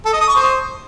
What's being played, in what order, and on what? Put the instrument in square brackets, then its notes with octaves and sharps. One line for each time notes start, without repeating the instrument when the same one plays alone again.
[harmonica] A4
D#5
D#6
C#6
C5